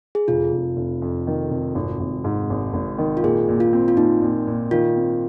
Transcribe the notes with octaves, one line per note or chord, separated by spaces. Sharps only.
G#4
F1 F4
F1
F1
F2
D#3
F1
G#1
G#1
G#2
G#1
G#1
D#3
F4
A#2 G#4
A#2
F4
C4
F4
A#2 D#4
A#2
A#2
D#3 F4
C4